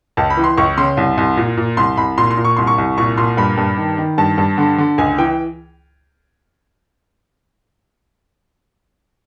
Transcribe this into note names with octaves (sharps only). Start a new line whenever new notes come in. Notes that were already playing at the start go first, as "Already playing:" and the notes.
C#2 A5
B5
E3
C6
C#2 C#6
C#3 C6
C2
C2
A#2
A#2
C2 C6
C2 B5
A#2 C6
C6
A#2
C#6
C2 C6
C#6
C2
A#2 C#6
A#2 C6
G2 B5
G2
D#3
D#3
G2 A5
G2
D3
D3
C#2 G#5
E3 G5